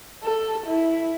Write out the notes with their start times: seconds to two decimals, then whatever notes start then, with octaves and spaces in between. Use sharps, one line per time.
0.24 A4
0.66 E4